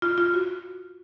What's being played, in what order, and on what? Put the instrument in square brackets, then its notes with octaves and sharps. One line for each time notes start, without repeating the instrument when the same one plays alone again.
[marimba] F4
F4
F#4